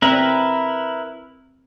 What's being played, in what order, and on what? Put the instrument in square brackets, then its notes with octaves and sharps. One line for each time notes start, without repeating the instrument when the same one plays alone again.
[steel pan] C4 [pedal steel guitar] E4 A#4 B4